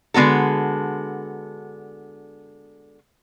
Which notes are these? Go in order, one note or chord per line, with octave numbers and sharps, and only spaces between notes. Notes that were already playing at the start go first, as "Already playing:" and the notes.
D3 G#3 B3 F#4 A4